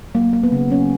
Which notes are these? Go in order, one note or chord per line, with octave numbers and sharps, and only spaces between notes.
F#3 A#3
A#3
B3
C#3
F#3 C#4